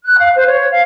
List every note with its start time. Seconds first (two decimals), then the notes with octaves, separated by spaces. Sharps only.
0.05 F#6
0.19 F5
0.35 C5
0.47 C#5
0.71 F5